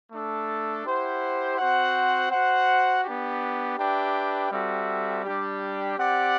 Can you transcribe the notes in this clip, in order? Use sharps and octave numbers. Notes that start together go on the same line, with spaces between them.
A3 D4 A4
E4 G4 C5 F#5
C4 F#4 C5 F#5
F#4 C5 F#5
B3 D4 G4
D4 G4 B4 E5 G5
G3 C4 F#4 A4 E5
G3 D4 G4
C4 G4 D5 F#5